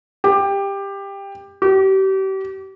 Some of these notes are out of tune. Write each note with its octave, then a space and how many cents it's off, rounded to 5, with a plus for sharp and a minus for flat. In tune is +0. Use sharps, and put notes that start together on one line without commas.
G4 +15
G4 -35